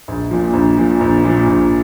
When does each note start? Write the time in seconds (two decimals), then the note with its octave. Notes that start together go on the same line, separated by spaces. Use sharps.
0.08 A#1
0.31 A#2 F3
0.54 A#1
0.77 A#2 F3
1.01 A#1
1.24 A#2 F3
1.47 A#1